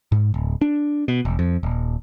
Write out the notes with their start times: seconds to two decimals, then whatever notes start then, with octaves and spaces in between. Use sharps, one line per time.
0.12 G#2
0.34 D1
0.61 D4
1.08 B2
1.25 E1
1.39 F2
1.63 D#1